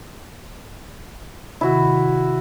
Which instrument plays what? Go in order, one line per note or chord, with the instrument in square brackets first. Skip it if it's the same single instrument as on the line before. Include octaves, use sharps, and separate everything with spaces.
[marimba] C3 D#3 [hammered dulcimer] E4 F#4